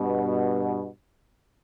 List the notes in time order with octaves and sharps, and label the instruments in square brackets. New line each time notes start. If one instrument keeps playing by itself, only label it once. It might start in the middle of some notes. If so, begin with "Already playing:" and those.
Already playing: [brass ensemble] G2 B2